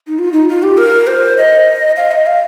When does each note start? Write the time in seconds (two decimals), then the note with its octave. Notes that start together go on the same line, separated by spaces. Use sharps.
0.07 D#4
0.19 F4
0.33 D#4
0.49 F4
0.63 G4
0.77 A#4
1.07 C5
1.38 D#5
1.97 F5
2.11 D#5
2.26 F5